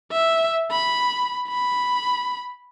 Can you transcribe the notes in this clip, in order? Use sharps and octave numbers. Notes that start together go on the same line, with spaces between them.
E5
B5
B5